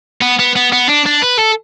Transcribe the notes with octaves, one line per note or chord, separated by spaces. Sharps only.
B3
B3
B3
B3
D4
D4
B4
A4